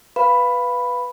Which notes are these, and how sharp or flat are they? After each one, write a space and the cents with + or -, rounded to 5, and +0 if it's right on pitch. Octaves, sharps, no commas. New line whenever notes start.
B4 +0 F5 -5 B5 +0